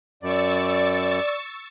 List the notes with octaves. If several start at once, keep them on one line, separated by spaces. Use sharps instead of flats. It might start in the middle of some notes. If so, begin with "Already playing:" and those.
F#2 D5 C#6 E6 A6